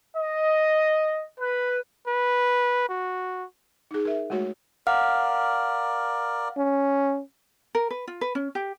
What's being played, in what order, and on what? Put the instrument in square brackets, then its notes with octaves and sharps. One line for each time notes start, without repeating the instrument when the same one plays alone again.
[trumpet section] D#5
B4
[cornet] B4
F#4
[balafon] D#4 G#4
A#4 E5
G#3 A3 F#4 C#5
[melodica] A#4 D5 [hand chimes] F5 F#5 F6
[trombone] C#4
[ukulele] A#4
B4
F4
B4
C#4
G4